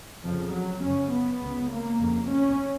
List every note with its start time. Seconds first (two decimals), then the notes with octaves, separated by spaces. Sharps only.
0.24 F2 C#3 F3
0.54 F#3
0.83 F#2 C#3 C#4
1.12 B3
1.41 C#2 C#3
1.71 A#3
2.00 F2 C#3
2.29 C#4